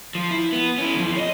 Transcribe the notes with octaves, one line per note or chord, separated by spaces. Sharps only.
F3
E4
B3
C#4 E4
E2 F3
C#5 D#5